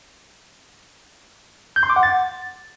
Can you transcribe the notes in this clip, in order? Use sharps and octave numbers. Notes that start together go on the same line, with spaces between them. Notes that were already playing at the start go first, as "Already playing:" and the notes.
G6
C6
D6
F#5
A6